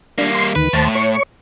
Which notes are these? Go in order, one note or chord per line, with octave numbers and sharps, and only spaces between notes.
G3 A#3 D4
C6
D2 D#3 B4
D#2 A2 C5 A5
C#5 C#6